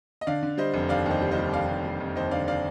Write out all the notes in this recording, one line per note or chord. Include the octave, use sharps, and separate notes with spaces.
D#5
D3 D5 F5
D3
G3 C5 D#5
F1
D#2 D5 F5
D#2 C5 D#5
G3
C5 D#5
G3
D#2 D5 F5
D#2
G3
F1
D#2 C5 D#5
D3 D5 F5
D5 F5